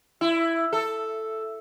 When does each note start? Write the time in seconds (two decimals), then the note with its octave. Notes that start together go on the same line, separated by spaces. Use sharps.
0.21 E4
0.73 A4